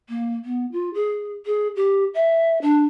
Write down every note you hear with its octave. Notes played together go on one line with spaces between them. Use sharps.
A#3
B3
F4
G#4
G#4
G4
E5
D4